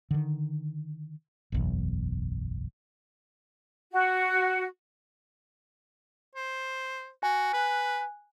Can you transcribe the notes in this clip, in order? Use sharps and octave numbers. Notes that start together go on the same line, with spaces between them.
D3 D#3
F#1 B1 E2
F#4
C5
F#4 G#5
B4 G#5 F#6